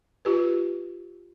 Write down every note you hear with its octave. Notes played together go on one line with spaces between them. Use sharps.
F4 G4 B4